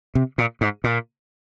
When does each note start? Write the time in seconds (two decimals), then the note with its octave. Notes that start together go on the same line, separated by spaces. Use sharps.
0.15 C3
0.38 A#2
0.61 G#2
0.84 A#2